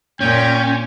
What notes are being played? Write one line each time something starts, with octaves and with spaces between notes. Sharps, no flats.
A#2 C#4 G5